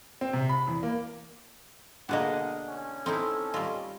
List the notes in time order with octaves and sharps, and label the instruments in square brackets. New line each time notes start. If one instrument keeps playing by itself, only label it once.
[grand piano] C4
C3
B5
E2
A#3
[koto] B2 D3 A#3 [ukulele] D4 G#4 D#5 [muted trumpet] F#5
[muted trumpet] C#4
[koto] C4 D#4 E4 [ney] A4
[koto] G3 F4 [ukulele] D#5